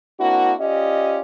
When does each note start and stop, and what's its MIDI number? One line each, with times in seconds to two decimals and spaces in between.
0.20 0.53 58
0.20 0.53 60
0.20 0.53 62
0.20 0.53 64
0.20 0.53 66
0.59 1.21 61
0.59 1.21 65
0.59 1.21 67
0.59 1.21 74
0.59 1.21 75